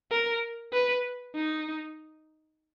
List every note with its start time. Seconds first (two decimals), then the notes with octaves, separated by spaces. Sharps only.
0.11 A#4
0.73 B4
1.35 D#4